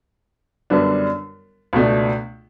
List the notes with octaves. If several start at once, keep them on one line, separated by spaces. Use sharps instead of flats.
F#2 D3 G3 B3 D4
C#2 B2 A3 D4